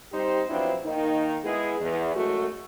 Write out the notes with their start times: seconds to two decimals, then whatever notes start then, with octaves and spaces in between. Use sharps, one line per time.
0.12 G3 C4 D#4 G4 C5
0.48 F3 F#3 B3 C4 D4 E4
0.84 D#3 A#3 D#4
1.43 G#3 B3 E4 G#4
1.79 E2
2.15 F#2 G#3 A3 F#4